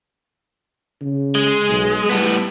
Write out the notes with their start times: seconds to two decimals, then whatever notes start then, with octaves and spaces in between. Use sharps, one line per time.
1.02 C#3
1.35 G#3
1.69 B1
2.09 A2 G3 B3